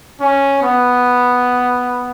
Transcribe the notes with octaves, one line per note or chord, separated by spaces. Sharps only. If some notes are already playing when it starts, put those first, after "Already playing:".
C#4
B3